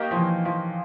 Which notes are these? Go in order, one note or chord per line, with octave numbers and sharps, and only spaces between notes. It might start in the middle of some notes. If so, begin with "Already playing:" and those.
Already playing: A#3 D#4 G4 A#4 C#5
F3
E3
F3